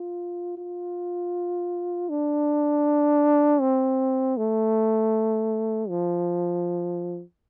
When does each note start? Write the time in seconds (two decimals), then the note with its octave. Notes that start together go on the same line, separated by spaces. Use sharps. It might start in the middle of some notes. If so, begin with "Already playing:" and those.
Already playing: F4
0.58 F4
2.09 D4
3.61 C4
4.37 A3
5.89 F3